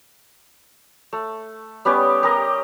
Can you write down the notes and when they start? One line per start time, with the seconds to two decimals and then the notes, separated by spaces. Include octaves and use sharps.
1.13 A3
1.85 G3 B3 C#4 G4
2.23 G4 A#4 D#5